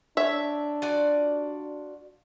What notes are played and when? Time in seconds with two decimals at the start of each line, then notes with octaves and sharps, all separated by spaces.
0.17 D4 C#5 E5
0.82 F4 F#4 D5